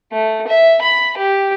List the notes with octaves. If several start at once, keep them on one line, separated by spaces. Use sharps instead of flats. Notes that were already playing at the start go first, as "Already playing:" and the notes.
A3
E5
B5
G4